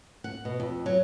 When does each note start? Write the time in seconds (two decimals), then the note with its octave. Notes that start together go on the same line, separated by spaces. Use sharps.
0.24 F#5
0.45 B2
0.60 F2
0.86 F#3